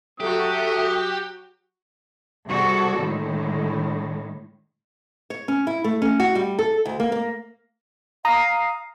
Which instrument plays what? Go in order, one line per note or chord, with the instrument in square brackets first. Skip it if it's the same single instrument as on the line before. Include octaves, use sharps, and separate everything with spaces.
[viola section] F#3 F#4 [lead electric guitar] G4 [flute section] A4 E5 [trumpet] D#6
[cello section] G2 C3 F#4 G#4 A4 D5
A2 D3 D#3 G#3
[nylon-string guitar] C#5
C#4
E4
A3
C#4
F#4
G3
A4
D2
A#3
A#3
[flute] F5 [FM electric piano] A#5 D#6